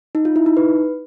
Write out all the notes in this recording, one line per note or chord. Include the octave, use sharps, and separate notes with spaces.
D#4
F4
E4
D#4
B4